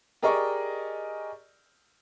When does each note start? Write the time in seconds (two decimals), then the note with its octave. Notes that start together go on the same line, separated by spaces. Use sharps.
0.23 G4 G#4 A#4 D5 D#5 C#6